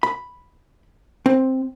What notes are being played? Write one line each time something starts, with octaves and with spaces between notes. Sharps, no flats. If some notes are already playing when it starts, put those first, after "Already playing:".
B5
C4